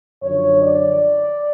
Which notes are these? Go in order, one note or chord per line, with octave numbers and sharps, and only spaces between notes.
F#2 D3 F3 C#5
D5